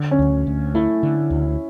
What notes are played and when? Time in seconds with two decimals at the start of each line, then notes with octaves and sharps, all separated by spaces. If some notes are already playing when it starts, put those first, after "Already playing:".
Already playing: D3
0.11 C#4
0.19 D2
0.47 D2
0.75 A3 E4
1.03 D3
1.30 D2